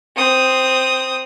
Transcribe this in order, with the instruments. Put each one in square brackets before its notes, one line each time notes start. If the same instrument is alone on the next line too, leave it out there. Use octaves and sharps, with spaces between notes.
[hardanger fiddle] C4 D#6